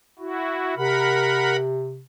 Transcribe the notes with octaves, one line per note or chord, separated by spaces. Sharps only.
E4 F#4
C3 A#4 F#5 B5